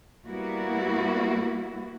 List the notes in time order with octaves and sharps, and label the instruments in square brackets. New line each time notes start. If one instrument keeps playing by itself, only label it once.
[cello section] G3 A#3 B3 E4 F#4